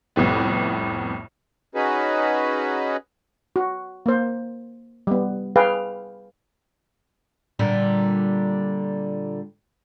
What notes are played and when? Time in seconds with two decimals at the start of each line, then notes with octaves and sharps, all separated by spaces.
0.16 C2 F2 A2 B3
1.75 C#4 D#4 F#4 G#4 B4
3.56 F#4
4.06 A#3 C5
5.07 G3 B3
5.56 G#4 B4 F5 G5
7.59 A#2 D3 G3